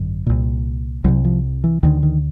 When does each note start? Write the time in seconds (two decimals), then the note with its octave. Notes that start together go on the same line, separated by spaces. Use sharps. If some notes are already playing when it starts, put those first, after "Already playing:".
Already playing: G#1 F#2 D3
0.26 C2 A#2
1.04 C2 C3 F#3
1.24 F3
1.64 E3
1.83 D2 D3 D#3
2.03 D#3